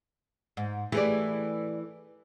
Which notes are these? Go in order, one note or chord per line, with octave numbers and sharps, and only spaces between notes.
G#2
E3 A3 G4 G#4 D5